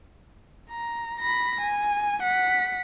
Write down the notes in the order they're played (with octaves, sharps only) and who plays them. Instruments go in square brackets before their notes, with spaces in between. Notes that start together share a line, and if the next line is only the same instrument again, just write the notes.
[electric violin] A#5
B5 A#6
G#5
F#5 B6